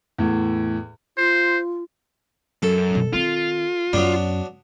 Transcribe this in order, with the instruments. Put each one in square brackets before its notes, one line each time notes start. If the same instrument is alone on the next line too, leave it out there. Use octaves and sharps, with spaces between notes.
[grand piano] E2 A2
[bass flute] F4 [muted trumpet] C5
[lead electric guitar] F#2 [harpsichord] A4
[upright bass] B2 D#3
[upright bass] D#3 C4 [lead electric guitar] F4
[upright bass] F#2 [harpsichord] F#3 B3 D4